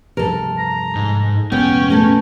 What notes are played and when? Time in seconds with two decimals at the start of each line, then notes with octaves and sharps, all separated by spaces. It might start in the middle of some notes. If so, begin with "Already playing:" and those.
0.17 G2 C3 F3 A4 A#4
0.58 A#5
0.95 G#2
1.52 F1 A#2 G#3 B3 C#4 G5
1.90 A3 A#4